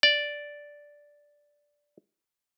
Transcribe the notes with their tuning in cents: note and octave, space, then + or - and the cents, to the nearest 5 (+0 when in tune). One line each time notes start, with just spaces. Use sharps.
D5 -5